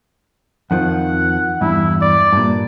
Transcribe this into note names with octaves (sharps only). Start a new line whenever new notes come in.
F2 D#3 F3 F#5
E2 G2 E4
D5
G2 A#2